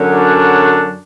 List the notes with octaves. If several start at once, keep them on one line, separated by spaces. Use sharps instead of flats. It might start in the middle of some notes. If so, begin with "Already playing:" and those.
Already playing: F#2 D3 F#3
D4